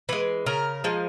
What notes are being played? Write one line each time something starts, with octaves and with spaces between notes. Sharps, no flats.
E3 G#3 B4
C#3 A#4
F3 G#3